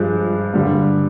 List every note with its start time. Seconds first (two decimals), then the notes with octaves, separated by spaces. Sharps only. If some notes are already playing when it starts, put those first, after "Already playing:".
Already playing: G2 F3 G#3
0.54 G2 D3 G3